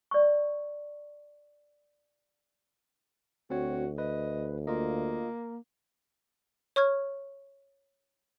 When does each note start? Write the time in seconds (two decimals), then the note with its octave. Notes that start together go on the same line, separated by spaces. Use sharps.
0.11 D5 C#6
3.50 D2 C4 F#4 C#5
3.98 B4 D#5
4.67 A#3 F4 D#5
6.76 C#5 C#6 F6 G#6